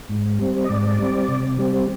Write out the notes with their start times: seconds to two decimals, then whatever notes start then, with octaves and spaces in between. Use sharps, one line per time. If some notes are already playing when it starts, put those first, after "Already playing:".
0.09 G#2
0.39 G3 C4
0.64 D#5
0.69 G#2 D5
0.99 G3 C4
1.28 C3
1.58 G3 C4